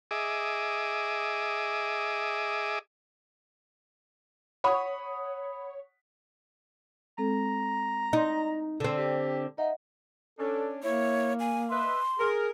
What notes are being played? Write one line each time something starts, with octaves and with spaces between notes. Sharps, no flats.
G#4 D#5 E5 D6
C#5 F#5 B5 D#6
G#3 C4 A4 A#5
D#4 D#5 C6
D3 C4
G4
D#4 D#5 E5 F#5
C#4 D4 A4
A#3 E4 C#5
G#5
B4 D#5 E5 C6
G#4 A#4